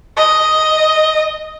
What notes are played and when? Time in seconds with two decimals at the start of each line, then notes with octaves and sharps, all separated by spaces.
0.17 D#5